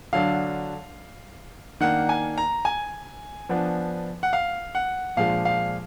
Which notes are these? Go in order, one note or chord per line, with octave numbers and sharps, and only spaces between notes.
D3 F#3 D4 F5
D#3 A#3 D4 F#5
G#5
A#5
G#5
F3 B3 D4
F#5
F5
F#5
A#2 F3 G#3 D4 F5
F5